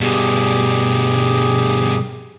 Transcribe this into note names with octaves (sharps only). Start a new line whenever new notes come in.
G2 B2 G4 G#4